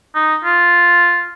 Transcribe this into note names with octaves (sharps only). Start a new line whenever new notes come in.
D#4
F4